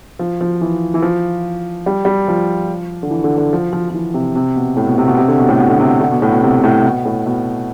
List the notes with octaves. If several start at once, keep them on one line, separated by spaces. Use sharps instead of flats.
F3
F3
E3
E3
F3
G3
G3
F3
D3
E3
D3
D3
F3
F3
F3
E3
C3
C3
B2
A2
B2
C3
B2
C3
D3
B2
A2
B2
D3
C3
D3
B2
A2
B2
C3
A2
B2
A2
B2